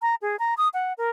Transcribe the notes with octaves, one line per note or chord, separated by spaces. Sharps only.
A#5
G#4
A#5
D#6
F#5
A#4